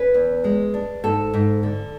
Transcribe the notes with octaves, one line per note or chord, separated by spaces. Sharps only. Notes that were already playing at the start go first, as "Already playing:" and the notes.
Already playing: C#4 B4
E2
G#3
D4
G#2 A4
G#2
D3